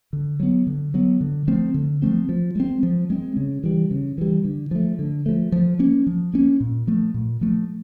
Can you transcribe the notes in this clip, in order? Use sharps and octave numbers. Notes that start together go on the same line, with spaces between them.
D3
F#3 B3
D3
F#3 B3
D3
F3 A3 C4
D3
F3 A3 C4
F3
G#3 C4
F3
G#3 C4
C#3
E3 G3
C#3
E3 G3
D3
F3 A3
D3
F3 A3
F3
A#3 C#4
F3
A#3 C#4
A#2
F3 A3
A#2
F3 A3